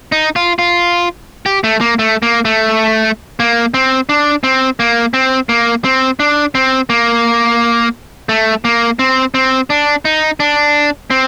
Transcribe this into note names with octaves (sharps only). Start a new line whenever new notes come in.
D#4
F4
F4
G4
A3
A#3
A3
A#3
A3
A#3
C4
D4
C4
A#3
C4
A#3
C4
D4
C4
A#3
A3
A#3
C4
C4
D4
D#4
D4
C4